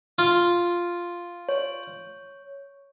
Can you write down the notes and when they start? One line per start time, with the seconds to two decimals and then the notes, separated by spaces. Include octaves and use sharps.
0.18 F4
1.49 C#5